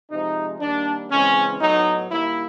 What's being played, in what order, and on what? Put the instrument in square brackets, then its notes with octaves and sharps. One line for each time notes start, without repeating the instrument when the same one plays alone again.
[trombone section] C3 F3 G#3 D#4
D#3 G3 A#3 D4
C#3 E3 G#3 C4 C#4
A2 F#3 B3 D#4
D#3 G3 A#3 E4